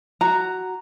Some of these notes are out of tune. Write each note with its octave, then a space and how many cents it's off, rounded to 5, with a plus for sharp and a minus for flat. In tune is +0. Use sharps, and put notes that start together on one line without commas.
F#4 +5 A#5 +0